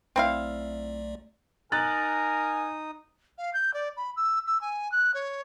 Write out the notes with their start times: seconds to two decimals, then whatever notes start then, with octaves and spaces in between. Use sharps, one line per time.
0.16 B1 A3 C4 E4 D5 F5
1.72 D#4 A#4 G#5 D#6 F#6 A6
3.38 F5
3.53 G6
3.74 D5
3.97 B5
4.16 E6
4.46 E6
4.61 G#5
4.92 F#6
5.14 C#5